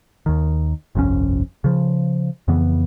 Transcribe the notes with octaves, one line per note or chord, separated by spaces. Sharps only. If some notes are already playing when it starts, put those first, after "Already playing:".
D#2 D#3
G1 C2 F2 C#4
C#3 F3
F2 C#3 E3 B3